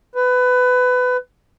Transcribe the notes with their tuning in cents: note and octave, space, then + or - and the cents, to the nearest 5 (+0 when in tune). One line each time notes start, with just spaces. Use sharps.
B4 +20